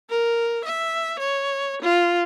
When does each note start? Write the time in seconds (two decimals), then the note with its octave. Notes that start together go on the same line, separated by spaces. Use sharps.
0.10 A#4
0.65 E5
1.19 C#5
1.82 F4